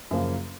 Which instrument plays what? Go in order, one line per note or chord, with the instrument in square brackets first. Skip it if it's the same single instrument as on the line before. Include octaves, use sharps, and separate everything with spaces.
[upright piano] F#2 C#3 F3 A#3